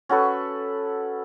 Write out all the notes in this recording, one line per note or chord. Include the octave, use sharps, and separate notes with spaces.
C#4 F#4 A4 B4